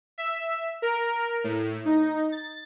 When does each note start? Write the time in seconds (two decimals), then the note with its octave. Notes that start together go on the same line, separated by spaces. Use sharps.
0.18 E5
0.82 A#4
1.44 A2
1.85 D#4
2.32 A6